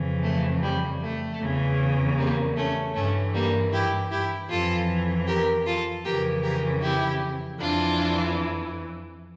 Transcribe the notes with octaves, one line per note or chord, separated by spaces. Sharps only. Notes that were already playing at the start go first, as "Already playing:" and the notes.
Already playing: F2 C#3 E3
A3
G3
A3
E2 C#3 E3
G3 A#3
A3 C#4
G2 E3 A3 C#4
G3 A#3
E4 G4
E4 G4
F2 E3 F4 A4
G4 A#4
F4 A4
F2 C#3 E3 G4 A#4
G4 A#4
E4 G4
F2 E3 D4 F4